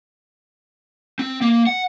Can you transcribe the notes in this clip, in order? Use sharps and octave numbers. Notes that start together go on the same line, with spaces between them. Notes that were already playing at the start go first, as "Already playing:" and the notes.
C4
A#3
F#5